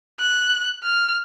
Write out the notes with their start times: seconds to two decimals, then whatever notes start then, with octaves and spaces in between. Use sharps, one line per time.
0.20 F#6
0.83 F6